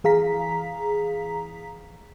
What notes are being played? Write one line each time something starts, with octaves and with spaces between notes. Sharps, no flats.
E3 G#4 F5 A#5 B6